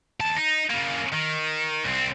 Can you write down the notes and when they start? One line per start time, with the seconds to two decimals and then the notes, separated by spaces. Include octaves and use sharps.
0.20 D#2 A5
0.36 D#4
0.70 C#3 A#3
1.13 D#3
1.84 C2 C4